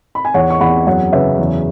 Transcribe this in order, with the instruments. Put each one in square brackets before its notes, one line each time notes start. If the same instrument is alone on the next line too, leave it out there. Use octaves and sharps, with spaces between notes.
[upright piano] B5
G#5
E2 C#5 F#5
C#6
E2 F#5 B5
F#2 C#5 F#5
C#3 B4 E5
E2